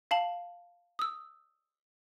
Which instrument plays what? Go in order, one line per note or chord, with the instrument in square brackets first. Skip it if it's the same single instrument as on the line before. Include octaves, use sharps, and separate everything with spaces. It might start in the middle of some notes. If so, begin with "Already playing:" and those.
[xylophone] F5 A5 F#7
D#6 E6